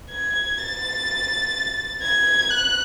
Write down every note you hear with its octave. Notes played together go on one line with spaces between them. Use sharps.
G#6
A6
G#6
F#6